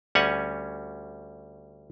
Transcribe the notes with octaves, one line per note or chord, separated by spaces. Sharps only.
D2 G3 C#4 C#5 F#5 G#5